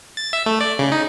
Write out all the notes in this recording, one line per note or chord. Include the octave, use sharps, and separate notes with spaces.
A6
E5
A3
D5
C#3
D#4